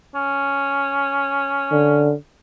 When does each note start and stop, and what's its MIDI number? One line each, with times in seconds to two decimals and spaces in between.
0.15 2.16 61
1.71 2.14 50